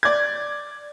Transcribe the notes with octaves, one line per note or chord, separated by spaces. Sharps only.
D5 G#6